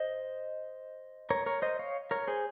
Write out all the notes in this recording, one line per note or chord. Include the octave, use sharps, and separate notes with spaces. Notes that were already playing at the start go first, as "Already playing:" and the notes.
Already playing: C5 D#5
A#4 C#5
A#4 C#5
C5 D#5
C#5 F5
A#4 C#5
G#4 C5